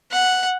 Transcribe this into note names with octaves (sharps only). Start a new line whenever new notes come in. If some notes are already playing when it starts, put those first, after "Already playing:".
F#5